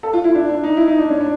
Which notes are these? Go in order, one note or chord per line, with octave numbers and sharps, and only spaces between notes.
A4
F4
E4
D4
D4
D#4
E4
D#4
D4
C#4
D4